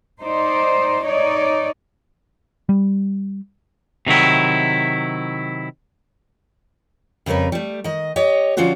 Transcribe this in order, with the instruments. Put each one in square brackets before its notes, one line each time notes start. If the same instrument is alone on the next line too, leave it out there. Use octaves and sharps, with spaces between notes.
[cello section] D#4 C5 D5
D#4 C#5 D5
[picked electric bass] G3
[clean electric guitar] C3 D#3 F#3 E4
[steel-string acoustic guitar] F2 C#3 G3 A#4 B4
G3 A3
D#3 D#5
G4 C#5 D#5
D3 F3 C#4 F4 F#4 C5